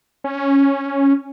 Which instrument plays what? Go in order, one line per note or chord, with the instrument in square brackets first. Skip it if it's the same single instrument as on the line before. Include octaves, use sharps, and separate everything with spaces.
[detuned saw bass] C#4